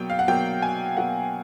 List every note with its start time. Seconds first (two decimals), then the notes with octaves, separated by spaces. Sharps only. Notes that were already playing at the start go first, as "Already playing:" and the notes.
Already playing: B2 F#3 A#3 G5
0.10 F5
0.19 F#5
0.28 B2 F#3 A#3 G5
0.62 G#5
0.97 B2 F#3 A#3 F#5